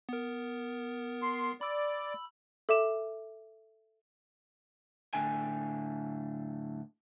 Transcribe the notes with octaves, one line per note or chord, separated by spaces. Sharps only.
B3 A#4
C6
D5 B5 E6
A4 E5 D6 E7
A2 D3 G5 G#5